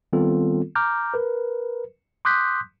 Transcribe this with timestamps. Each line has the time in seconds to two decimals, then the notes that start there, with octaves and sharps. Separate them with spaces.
0.13 D#3 G3 B3 C4 F4 A4
0.75 A#5 D6 F6 G6
1.14 A#4 B4
2.25 C6 D6 D#6 F#6 G6 B6